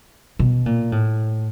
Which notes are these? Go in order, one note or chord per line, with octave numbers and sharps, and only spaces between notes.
B2
A#2
A2